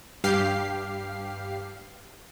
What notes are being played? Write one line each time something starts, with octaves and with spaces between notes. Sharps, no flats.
G2 G4 F5 C7